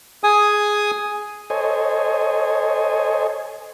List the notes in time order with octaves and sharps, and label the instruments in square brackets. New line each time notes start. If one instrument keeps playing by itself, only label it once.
[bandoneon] G#4 G#5 D#6
[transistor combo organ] A4 C5 C#5 D#5 G#5